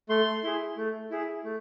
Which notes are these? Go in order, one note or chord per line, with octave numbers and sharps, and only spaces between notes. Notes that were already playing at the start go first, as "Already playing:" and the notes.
A3 C6
E4 G#4
A3
E4 G#4
A3